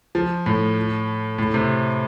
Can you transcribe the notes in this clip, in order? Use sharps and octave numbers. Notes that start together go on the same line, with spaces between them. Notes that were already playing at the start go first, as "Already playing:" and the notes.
F3
A2
A2
C3